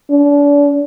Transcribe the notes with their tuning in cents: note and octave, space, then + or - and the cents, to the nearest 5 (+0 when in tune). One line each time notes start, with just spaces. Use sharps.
D4 -35